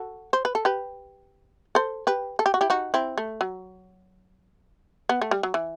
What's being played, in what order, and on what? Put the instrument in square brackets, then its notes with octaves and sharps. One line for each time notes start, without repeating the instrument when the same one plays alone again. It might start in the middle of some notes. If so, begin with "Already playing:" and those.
Already playing: [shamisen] F#4 A4
C5
B4
A4
G4 B4
A4 C5
G4 B4
A4
G4
F#4
E4 G4
D#4 F#4
C4 E4
A3
F#3
B3
A3
G3
F#3
E3